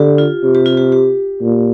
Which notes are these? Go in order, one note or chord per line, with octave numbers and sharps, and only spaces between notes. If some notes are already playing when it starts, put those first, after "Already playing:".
Already playing: D3 G4
F4
C3
G4
F4
G4
G4
A#2